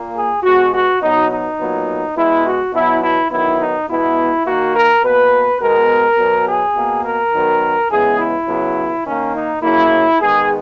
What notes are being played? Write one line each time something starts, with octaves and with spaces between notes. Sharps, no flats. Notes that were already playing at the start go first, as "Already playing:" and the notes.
Already playing: A#2 A#3
G#4
B2 G#3 B3 F#4
F#4
B2 F#3 B3 D#4
D#4
A#2 F#3 B3
B2 G#3 B3 E4
F#4
B2 F#3 B3 E4
E4
D#3 F#3 B3 E4
D#4
B2 G#3 B3 E4
D#3 A#3 F#4
A#4
B2 A#3 B4
B2 G#3 B3 A#4
B2 F#3 B3
G#4
B2 A#3
A#4
D#3 F#3 B3
C#3 E3 G#3 B3 G#4
E4
C#3 F#3 B3
D#3 A#3 C#4
D#4
C#3 F#3 A#3 E4
D#3 G#3 B3 G#4